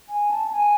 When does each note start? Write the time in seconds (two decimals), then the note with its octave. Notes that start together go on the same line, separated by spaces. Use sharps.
0.09 G#5
0.31 A5
0.47 A5
0.52 G#5